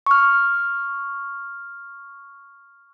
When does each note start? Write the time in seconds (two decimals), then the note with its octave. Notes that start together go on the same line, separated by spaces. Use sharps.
0.06 C#6 F6